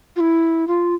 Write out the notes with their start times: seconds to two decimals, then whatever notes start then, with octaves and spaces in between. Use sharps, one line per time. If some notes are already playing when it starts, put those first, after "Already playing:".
0.16 F4
0.20 E4
0.67 F4